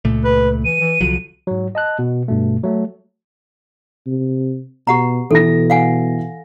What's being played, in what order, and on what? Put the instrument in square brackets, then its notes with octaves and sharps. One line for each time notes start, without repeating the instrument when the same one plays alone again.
[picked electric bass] C#2 A#2 A3
[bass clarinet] B4
[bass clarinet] E3 [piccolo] D#7
[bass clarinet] E3
[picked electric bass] C2 F3 F#3 [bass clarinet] D3
[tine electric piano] G#2 F#3
D#5 A5 F#6
B2
G2 B2 A3
F#3 A3
[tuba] C3
[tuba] B2 [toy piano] G4 F#5 A#5
[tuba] B2 [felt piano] E3 A#6 [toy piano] A4
[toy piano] F5 F#5 G#5